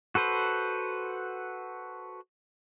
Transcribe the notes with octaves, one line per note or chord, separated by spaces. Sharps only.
F#4 A4 B4 C5